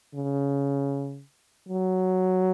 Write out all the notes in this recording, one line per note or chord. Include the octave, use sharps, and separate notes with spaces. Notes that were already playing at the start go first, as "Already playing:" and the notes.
C#3
F#3